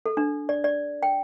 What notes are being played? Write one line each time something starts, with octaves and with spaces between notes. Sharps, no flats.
A4
D4
D5
D5
G5